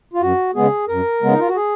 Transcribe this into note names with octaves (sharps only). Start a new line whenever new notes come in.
F4
F#2 F#4
C#3 G#3 B3 G#4
F#2 A#4
C#3 G#3 B3
D#4
F4
F#4
G#4